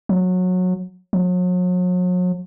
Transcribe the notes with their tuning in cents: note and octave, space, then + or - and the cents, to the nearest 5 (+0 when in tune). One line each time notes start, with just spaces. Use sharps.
F#3 -20
F#3 -40